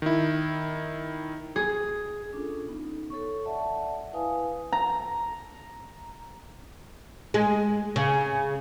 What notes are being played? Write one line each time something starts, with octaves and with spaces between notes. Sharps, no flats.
D#3 E4
G#4
C#4 D4 F4 A4
B3 D#4
A4 C#5 C#6
D5 E5 F#5 A5
E4 B4 F5 G#5 D#6
A#5
G#3
C#3